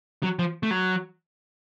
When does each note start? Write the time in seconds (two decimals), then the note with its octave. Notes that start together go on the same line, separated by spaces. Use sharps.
0.23 F#3
0.39 F3
0.63 A3
0.71 F#3